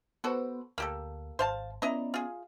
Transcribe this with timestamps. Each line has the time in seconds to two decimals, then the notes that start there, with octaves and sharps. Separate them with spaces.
0.24 B3 F#4 A4 B4 C5
0.78 D2 A#3 G4 A4
1.39 G#1 C5 F5 A5
1.82 B3 C#4 E4 D5 D#5 A#5
2.14 F4 G#4